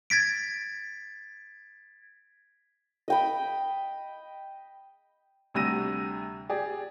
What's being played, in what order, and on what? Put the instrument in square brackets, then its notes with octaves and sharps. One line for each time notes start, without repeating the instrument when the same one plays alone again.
[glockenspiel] G#6 A6 B6 D7
[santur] D#5 G5 B5
[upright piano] D2 C3 G3 E6 A#6 D#7
G4 G#4 D5